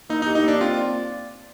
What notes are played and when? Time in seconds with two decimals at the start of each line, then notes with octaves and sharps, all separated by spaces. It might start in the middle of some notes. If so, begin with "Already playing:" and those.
0.10 A#3 D#4
0.22 D#4
0.27 G4
0.35 D#4
0.43 A#3 D4
0.61 C4 F4
0.78 D5